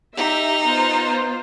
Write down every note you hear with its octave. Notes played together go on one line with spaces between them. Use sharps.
D#4 G4 E5
B3 F4 C5